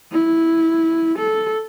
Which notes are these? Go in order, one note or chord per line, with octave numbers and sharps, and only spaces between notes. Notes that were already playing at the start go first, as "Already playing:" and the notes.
E4
A4